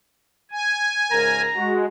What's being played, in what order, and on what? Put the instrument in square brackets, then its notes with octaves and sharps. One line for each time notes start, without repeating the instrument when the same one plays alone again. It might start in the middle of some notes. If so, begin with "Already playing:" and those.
[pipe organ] G#5
[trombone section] G#2 C#3 A#4 [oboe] A#5
[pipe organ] G#3 [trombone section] F#4